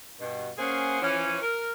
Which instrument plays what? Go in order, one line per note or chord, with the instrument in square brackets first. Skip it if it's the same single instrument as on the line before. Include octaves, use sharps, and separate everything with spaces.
[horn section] G2 B2
A#3 C#4 G#4 C5 F#5
E3 F3 C#4
A#4